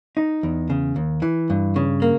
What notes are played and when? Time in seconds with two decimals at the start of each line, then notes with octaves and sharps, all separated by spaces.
0.17 D#4
0.43 E2
0.70 C#3
0.96 D#2
1.22 E3
1.50 G2
1.76 C#3
2.02 A#3